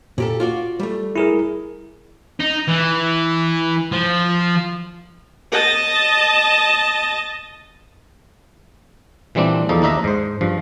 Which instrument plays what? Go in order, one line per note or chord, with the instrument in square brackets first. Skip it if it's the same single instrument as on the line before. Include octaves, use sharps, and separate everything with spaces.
[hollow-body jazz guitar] A#2 G4 A4
F4 F#4 D5
G3 A3
[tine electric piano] E4 G#4 A#4
[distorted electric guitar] D#4
E3
F3
[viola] D#5 A5
[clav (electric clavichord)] A#2 E3 G3 C4 D4
E2 F3 D#4 A4
D#2 D4 D#4 E5 A#5
G#2 C5
G2 F3